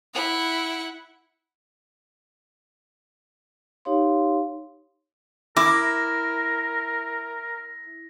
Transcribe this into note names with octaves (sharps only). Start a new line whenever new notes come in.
E4 F#5
D#4 G4 C#5 F5 C6
E4 A#4 D6 A#6